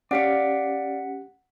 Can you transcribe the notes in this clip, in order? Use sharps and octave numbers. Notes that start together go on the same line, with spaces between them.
C#4 G4 D5 F5 F#5 B6 C#7